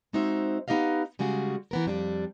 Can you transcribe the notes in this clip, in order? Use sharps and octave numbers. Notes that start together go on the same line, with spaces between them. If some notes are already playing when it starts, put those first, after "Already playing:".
G#3 C4 D#4 F#4 C5 E5
B3 D#4 G4 D#5 F5
C#3 G3 G#3 F#4 G#4
E3 B3 A#4
F2 G3 D4